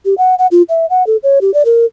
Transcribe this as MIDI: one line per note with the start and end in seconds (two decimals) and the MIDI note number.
0.05 0.14 67
0.18 0.35 78
0.39 0.47 78
0.51 0.62 65
0.69 0.86 76
0.90 1.06 78
1.07 1.17 69
1.23 1.39 73
1.41 1.53 67
1.54 1.63 74
1.65 1.85 70